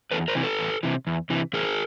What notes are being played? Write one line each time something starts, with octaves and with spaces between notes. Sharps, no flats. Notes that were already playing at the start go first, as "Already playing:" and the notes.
E2 A4 B4
A#4 C5
C3 E3
A4 B4
E2
C3 E3
E2
C3 E3
E2 G#4 A#4